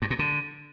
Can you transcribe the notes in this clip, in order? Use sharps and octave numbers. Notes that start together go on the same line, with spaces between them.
G2
A#2
D3